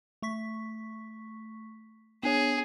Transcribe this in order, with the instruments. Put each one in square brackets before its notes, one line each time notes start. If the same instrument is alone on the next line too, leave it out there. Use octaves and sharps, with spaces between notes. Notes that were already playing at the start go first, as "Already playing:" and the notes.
[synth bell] A3 C#6 B6
[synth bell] B3 D4 C#5 [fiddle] G#4